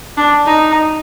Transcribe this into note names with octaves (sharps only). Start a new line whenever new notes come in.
D4
D#4